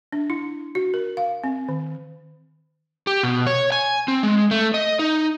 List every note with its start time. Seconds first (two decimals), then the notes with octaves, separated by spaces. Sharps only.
0.12 D4
0.30 E4
0.75 F#4
0.94 A#4
1.17 F5
1.44 C4
1.68 D#3
3.07 G4
3.23 B2
3.47 C#5
3.72 G#5
4.08 C4
4.23 G#3
4.51 A3
4.74 D#5
4.99 D#4